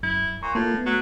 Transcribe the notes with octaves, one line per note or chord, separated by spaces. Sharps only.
F#2 E4
A#2 C#6
A2 A#3 F4 A#4
A3 B3
F#3